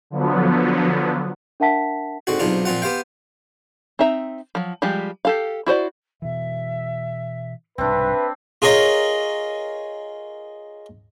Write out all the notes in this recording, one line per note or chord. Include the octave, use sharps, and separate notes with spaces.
D3 F3 F#3 B3
D4 A#4 E5 F#5 A5 B6
G#2 D3 C4 F#4
B1 G#2 C3 D4 F4
A#2 F3 C4 F4 F#5
B3 G4 C5 F5 G5
C4 D#4 E5 A#5
F3 F#3
F3 G3 G#3 G4
G4 A4 F5
E4 F#4 C5 D5
B2 E3 E5
C2 G#2 B2 C4 D4 B4 E5
F4 G#4 A#4 C#5 D#5